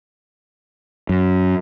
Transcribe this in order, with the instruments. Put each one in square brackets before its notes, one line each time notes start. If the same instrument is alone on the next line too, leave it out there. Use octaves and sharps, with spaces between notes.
[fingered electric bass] F#2